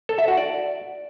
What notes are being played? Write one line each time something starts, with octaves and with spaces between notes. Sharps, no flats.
A4
E5
F#4
D5